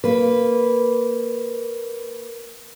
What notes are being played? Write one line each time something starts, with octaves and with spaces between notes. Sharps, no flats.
A#3 B4